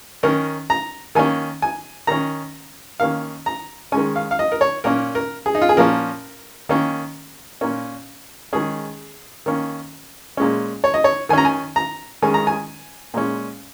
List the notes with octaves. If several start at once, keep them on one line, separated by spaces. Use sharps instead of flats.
D#3 C#4 A#4
A#5
D#3 A#3 C#4 G#5
G#5
D#3 C#4 A#5
D#3 A#3 C#4 F5
A#5
D#3 G#3 C#4 G#5
F5
F5
D#5
A#4
C#5
A#2 A#3 C#4 A#4
A#4
G#4
D#4
F4
G#4
A#2 F3 A#3 C#4 A#4
D#3 A#3 C#4
A#2 A#3 C#4
D#3 G#3 C#4 G#4
D#3 A#3 C#4
A#2 G#3 C#4
C#5
D#5
C#5
D#3 C#4 G#5 A#5
G#5
A#5
D#3 G#3 C#4 G#5
A#5
G#5
A#2 G#3 C#4